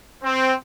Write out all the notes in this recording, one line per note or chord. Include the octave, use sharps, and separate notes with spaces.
C4